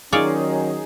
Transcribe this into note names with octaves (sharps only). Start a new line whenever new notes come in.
D#3 F#3 C#4 D#4 F4 G#4 C#5 D5